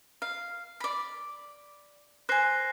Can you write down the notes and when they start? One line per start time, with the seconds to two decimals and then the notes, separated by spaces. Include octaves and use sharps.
0.22 F5
0.80 D5 B5
2.29 C5 G#5 F#6 A#6 C7